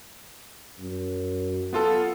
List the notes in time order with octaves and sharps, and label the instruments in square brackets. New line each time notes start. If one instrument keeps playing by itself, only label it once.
[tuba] F#2
[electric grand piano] B3 F4 A4